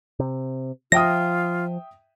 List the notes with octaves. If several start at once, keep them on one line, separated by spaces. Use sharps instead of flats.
C3
F3 F4 E5 G5 D#6 A#6